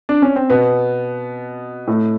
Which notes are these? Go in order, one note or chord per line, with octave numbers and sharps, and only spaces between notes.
D4
C#4
C4
B2 B3
A2 A3